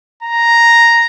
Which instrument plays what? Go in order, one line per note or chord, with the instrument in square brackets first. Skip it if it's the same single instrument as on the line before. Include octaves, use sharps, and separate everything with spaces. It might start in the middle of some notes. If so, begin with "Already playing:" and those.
[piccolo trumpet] A#5